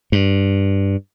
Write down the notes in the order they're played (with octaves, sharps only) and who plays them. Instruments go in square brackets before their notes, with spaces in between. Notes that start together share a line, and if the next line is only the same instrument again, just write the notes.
[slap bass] G2